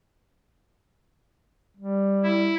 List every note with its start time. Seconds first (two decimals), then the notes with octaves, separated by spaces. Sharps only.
1.77 G3
2.23 E4